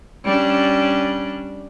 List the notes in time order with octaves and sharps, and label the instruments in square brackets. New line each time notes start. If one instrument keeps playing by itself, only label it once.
[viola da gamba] G3 C#4 D4